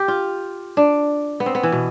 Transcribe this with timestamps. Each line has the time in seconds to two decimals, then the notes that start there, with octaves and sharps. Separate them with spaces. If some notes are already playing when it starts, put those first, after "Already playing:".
Already playing: G4
0.08 F4
0.77 D4
1.40 B3
1.46 C4
1.55 B3
1.63 E3
1.72 B2